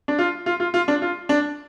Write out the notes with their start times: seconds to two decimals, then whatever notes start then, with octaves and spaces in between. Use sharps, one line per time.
0.08 D4
0.19 F4
0.46 F4
0.60 F4
0.74 F4
0.88 D4
1.02 F4
1.29 D4